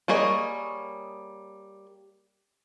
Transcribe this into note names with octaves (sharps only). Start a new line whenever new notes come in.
G3 A#3 G#4 C#5 D#5